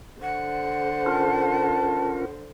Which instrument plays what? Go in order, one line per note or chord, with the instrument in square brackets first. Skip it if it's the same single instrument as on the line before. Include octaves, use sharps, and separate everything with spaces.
[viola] D3 C5 [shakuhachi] F#5
[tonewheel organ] C#4 F4 A#4 [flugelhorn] A5